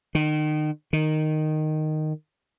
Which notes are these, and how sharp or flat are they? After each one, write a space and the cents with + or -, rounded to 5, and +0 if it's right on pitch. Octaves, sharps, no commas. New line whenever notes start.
D#3 -30
D#3 -10